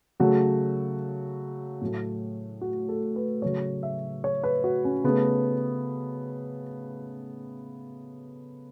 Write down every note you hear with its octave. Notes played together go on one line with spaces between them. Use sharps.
C#3 F#3 A3 F#4
A2 F#3 A3
F#4
A4
B4
C#3 F#3 A3 C#5
E5
C#5
B4
F#4
C#4
C#3 A3 B3